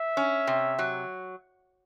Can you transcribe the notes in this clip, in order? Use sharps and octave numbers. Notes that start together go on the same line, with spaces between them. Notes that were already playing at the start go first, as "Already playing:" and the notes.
Already playing: E5
C#4
C3
F#3